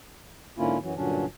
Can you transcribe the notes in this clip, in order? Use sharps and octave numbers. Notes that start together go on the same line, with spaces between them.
G#2 D3 A#3 C#4 E4 F4
F#2 E3 F#3
G2 A#2 D3 F#3 C#4 D4